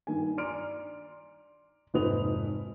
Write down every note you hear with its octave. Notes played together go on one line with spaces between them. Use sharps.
G2 D#3 G#5
D5 A#5 C6 F6 D7
F1 G#2 B4 C5 D#6 F7